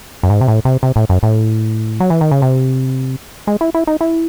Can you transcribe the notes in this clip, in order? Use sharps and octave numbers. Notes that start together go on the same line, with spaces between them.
F#2
G#2
C3
A2
C3
C3
A2
F#2
A2
F#3
E3
D#3
C#3
C3
G#3
E4
E4
D#4
E4